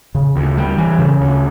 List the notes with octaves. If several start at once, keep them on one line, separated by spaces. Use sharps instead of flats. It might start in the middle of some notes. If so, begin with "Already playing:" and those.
C#3
D2
G3
E3
C#3
D2